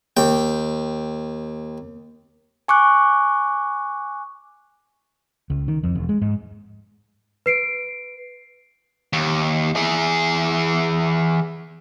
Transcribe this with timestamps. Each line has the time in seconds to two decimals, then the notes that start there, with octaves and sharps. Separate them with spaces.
0.17 D#2 G5
2.68 G#5 C#6 D6 F#6
5.50 C#2
5.68 D#3
5.83 F2
5.95 E1
6.09 G#3
6.22 G#2
7.46 B4 C7 D7
9.13 D#2
9.76 E3 G#4